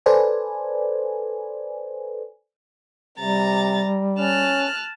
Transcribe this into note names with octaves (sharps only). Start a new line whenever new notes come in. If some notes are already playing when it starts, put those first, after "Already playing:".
A4 B4 C5 D5 G#5
C3 G3 A#5 A6
C#4 A5 F6 F#6